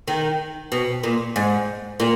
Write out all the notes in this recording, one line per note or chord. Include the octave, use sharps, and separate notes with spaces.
D#3
B2
A#2
G#2
A#2